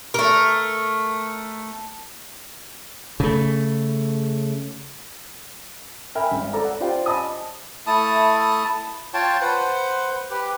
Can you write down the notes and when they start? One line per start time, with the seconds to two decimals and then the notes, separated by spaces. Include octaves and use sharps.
0.14 A3 A#4
3.20 C#3 A3
6.15 A#4 E5 G5 G#5 B5 F6
6.31 G#1
6.53 A4 D5 A#5 D6
6.65 F#5
6.80 F4 G4 C5 D5 F5 G5
7.06 D#5 G#5 A5 B5 D6 D#6
7.87 A3 E4 A5 D#6
9.14 F4 C#5 G5 A5
9.41 B4 C5 F#5
10.30 G4 B4